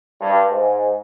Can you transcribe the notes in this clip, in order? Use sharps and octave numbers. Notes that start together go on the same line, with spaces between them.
G2
G#2